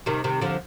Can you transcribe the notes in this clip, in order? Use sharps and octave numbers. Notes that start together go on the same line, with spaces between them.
C3 D#3
C3 D#3
D3 F3